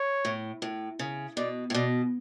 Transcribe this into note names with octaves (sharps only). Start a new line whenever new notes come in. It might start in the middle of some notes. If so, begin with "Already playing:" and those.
Already playing: C#5
A2
A2
C#3
B2 D5
A2
B2 D5